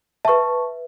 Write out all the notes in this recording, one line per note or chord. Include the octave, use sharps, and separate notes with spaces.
B4 E5 A5 C#6